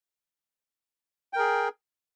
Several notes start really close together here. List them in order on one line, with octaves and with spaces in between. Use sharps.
G5 A#4 G#4